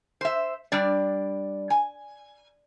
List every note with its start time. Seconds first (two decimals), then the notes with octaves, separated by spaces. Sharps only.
0.21 C5 E5
0.72 G3 D4 D5
1.70 G#5